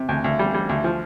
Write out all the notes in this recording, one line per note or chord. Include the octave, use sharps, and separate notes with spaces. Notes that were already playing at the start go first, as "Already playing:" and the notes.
Already playing: C3
D2
D2
G3
G3
D2
F3